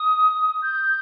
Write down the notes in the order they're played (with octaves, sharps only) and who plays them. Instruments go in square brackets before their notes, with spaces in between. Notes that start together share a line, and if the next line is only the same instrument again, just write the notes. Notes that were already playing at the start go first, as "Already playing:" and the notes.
Already playing: [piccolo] D#6
G6